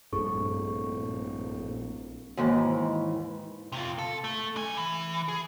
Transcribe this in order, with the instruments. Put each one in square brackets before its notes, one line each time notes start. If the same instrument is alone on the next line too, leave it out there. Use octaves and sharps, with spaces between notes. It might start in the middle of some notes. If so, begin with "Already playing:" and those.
[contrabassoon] D1 [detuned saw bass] A#1 [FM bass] G2 [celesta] G#4 A4 C#6
[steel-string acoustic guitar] D#2 G#2 E3
[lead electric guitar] C3 F4
A4
A3
D4 G#5
E3
G#4